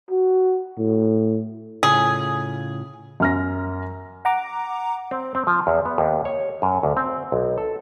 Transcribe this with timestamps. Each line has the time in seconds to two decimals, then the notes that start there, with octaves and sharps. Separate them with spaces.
0.11 F#4
0.78 A2
1.83 A2 C#3 F4 G#4
3.20 F#2 F6 A#6
4.25 F#5 A#5 D6
5.11 C4
5.35 C4
5.47 F3
5.67 E2
5.85 B3
5.98 D#2
6.25 C#5
6.62 F#2
6.83 D2
6.97 C4
7.32 B1
7.58 A4